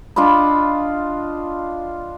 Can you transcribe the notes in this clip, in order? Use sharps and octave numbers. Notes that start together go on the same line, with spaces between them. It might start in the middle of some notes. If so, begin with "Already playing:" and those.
D4 F4 D#5 B5